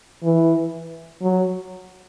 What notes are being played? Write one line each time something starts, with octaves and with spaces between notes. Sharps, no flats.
E3
F#3